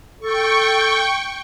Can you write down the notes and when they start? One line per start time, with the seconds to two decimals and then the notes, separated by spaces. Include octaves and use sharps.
0.21 A4 G5 C#6